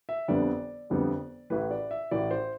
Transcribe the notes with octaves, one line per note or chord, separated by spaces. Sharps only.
E5
G1 F2 D3 G3 B3 D5
G1 F2 D3 G3 B3
A1 A2 E3 B4
D5
E5
A1 A2 E3 D5
C5